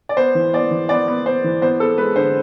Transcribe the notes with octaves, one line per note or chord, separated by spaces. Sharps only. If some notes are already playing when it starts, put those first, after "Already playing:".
D5
B3 C5
E3
B3 D5
E3
B3 D5
B3
B3 C5
E3
B3 C5
B3 A4
G#3 B4
D3 C5